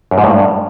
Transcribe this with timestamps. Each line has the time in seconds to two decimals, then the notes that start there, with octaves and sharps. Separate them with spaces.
0.11 F#2
0.18 G#2
0.24 A2
0.30 G2